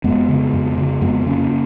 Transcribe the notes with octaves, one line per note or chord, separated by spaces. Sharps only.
F2 G#3 B3
C#3
F2
C#3
F2 G#3 B3
B3
C#3 A#3 C#4